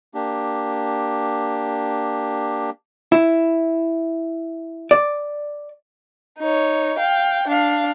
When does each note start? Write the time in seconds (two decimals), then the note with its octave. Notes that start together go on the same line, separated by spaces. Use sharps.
0.14 A#3 D4 G4
3.12 E4
4.91 D5
6.39 D#4 C#5
6.99 F5 G5
7.48 D4 F5